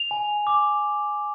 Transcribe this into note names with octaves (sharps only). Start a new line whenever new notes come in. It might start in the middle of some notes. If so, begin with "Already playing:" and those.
Already playing: F7
G#5
D6